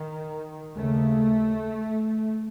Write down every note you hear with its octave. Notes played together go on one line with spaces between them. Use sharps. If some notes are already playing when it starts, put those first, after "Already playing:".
Already playing: D#3
D#2 C#3 A3